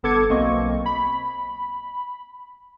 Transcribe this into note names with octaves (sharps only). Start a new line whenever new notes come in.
G1 B3 A4 D6 G#6 C#7
B1 A#3 C4 D#5 C#6
B5